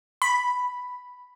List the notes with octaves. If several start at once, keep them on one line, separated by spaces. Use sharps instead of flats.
B5